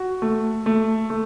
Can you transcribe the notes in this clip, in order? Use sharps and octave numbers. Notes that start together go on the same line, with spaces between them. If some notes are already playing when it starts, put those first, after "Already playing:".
Already playing: F#4
A3
A3
A3